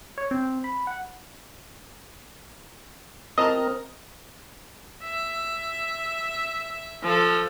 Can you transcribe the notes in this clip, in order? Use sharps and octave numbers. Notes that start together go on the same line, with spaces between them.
C#5
C4
B5
F#5
C4 A#4 D#5 A5 A#5
E5
F3 A4